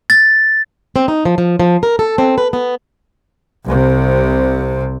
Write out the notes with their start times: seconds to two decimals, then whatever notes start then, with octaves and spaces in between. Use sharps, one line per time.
0.10 A6
0.96 C4
1.08 D#4
1.25 F3
1.38 F3
1.60 F3
1.83 A#4
1.99 A4
2.18 C4
2.38 B4
2.53 B3
3.66 C2 C3